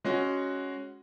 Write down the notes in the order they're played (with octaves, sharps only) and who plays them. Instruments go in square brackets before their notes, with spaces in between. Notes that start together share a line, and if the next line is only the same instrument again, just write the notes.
[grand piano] G#3 C#4 F#4